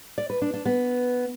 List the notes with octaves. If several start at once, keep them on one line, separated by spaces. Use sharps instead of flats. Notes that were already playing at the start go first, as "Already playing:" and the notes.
D5
B4
D4
D4
B3